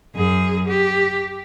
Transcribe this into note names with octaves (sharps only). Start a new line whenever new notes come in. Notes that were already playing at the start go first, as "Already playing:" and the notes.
F#2 G#4
G4